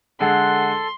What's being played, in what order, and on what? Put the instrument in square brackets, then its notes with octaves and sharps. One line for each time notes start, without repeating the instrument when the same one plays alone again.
[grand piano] D3 G#3 [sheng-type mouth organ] A4 [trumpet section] F#5 [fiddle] C6